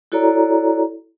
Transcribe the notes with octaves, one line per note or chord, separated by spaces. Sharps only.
E4 F#4 A4 C#5 D5 A#5